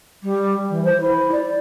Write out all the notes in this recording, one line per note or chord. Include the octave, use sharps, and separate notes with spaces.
G3
E3
C5
E4
D5